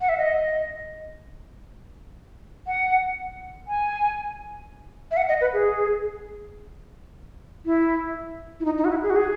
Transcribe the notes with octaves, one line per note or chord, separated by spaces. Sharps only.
F#5
E5
D#5
F#5
G#5
E5
F#5
D#5
B4
G#4
E4
E4
D#4
D#4
F#4
E4
G#4
F#4
G#4